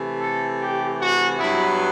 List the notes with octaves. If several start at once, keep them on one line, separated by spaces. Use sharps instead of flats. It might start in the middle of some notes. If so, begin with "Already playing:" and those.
Already playing: C3 E3 A3
A4
G4
F#4
G2 F#3 B3 E4